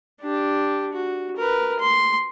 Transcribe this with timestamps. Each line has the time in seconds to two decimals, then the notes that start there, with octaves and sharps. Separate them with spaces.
0.22 D4 G4
0.92 F#4
1.37 A#4 B4
1.79 C6